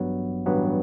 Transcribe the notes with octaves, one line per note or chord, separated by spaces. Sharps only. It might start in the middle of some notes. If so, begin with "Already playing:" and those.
Already playing: A1 G2 F#3 B3
A1 G2 F#3 B3